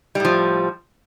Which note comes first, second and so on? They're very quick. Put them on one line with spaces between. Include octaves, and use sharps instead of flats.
G3 A2 F3